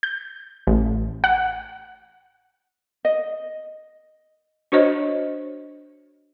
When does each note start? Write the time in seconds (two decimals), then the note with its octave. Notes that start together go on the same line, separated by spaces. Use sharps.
0.03 G6
0.67 A1
1.24 F#5
3.05 D#5
4.72 D4 F#4 C5 C#5 D#5